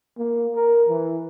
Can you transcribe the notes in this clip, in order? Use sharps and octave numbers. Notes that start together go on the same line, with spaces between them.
A#3
A#4
E3